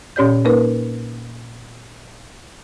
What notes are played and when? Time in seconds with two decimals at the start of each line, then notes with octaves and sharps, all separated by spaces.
0.16 A#2 C#4 G4 C#5 D5 G6
0.45 A#3 D#4 A#4 B4